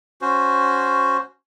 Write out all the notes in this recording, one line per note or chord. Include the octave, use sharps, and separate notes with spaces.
C#4 F#4 C5